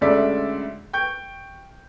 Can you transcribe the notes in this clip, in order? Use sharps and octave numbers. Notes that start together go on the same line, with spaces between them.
D2 C#3 G#3 A4 D5 E5
G5 C#6 G6